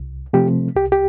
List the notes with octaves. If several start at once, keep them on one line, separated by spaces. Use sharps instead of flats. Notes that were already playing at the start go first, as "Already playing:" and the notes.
Already playing: C2
C3 F3 A3 C4 G4
C2 G4
G4